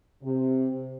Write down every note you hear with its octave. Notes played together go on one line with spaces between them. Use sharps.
C3